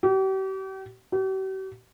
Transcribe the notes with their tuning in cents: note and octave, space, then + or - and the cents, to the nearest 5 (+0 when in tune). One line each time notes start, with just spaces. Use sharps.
G4 -40
G4 -45